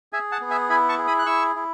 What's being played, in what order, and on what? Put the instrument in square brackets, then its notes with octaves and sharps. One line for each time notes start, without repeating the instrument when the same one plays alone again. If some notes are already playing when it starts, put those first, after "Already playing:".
[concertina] G#4 E5 G#5
F#5 A5
B3
E5 G#5
E4 G#5 B5
A5 C#6
G#4
B5 D#6
F#6
E4 C#6 E6
E4